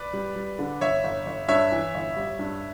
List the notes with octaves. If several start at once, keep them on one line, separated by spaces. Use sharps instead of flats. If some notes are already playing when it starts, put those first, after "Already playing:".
Already playing: B4 D5
G3
G3
D3
G1 C#5 E5
G1
G1
G2 C#5 E5
E3
G1
G3
G2